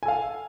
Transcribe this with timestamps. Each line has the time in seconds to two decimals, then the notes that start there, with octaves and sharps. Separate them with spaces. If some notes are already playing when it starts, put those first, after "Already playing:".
0.03 G#5
0.05 A4
0.08 F5